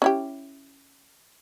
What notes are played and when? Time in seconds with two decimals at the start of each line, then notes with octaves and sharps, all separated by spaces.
0.02 C#4 E4 G4